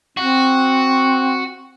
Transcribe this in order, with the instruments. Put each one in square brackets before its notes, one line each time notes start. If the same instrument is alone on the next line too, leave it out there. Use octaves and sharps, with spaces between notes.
[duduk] C4 [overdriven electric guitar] F#4